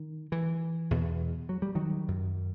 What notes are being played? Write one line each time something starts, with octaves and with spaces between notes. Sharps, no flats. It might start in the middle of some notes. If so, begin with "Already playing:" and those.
Already playing: D#3
E3
E2 B2
F#3
G3
D#3 F#3
F#2